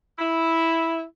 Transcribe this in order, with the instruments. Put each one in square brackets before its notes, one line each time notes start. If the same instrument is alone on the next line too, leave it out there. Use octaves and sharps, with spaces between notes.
[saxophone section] E4